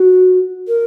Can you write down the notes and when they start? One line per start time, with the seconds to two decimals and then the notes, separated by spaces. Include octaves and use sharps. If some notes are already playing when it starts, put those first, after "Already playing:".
Already playing: F#4
0.68 A#4